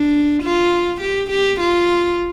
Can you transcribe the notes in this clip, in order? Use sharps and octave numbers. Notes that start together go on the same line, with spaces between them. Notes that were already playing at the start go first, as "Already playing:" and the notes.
Already playing: D4
F4
G4
G4
F4